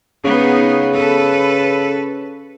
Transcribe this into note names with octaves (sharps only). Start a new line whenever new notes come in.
C#3 B3 D#4 G#4
A4 B4